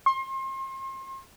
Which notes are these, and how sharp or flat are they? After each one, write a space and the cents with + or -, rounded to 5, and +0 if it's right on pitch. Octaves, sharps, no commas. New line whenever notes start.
C6 +35